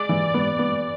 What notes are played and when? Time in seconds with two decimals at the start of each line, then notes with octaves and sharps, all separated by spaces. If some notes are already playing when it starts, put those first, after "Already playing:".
Already playing: G#3 D5
0.09 E3
0.34 B3
0.59 B3